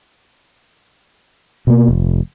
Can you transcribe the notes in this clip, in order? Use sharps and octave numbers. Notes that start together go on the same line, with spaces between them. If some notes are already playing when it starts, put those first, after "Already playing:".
B2 A#3
F1